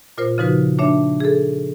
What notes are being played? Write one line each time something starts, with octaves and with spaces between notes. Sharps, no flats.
A#2 F4 A#4 C5
C#3 F3 D#4 F#4 B4
A3 D4 C#5 E5
G#4 A4